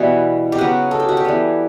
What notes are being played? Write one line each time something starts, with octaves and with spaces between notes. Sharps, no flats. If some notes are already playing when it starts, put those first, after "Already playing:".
Already playing: B2 E3 G3 B3 E4
G4
C#3 F#3 B3 F#4
A4
G4
F#4
G4
E3 G3 B3